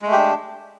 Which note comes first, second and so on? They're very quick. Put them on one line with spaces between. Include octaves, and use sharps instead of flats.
G#3 A3 G4 D4